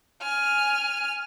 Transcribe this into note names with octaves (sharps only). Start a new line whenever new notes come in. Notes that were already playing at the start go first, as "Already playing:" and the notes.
G#5 F6